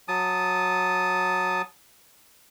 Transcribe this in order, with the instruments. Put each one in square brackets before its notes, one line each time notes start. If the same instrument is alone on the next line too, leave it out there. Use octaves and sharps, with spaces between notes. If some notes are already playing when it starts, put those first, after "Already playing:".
[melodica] F#3 A5 D#6